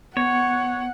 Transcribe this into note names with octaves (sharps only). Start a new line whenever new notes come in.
B3 C#5 F#5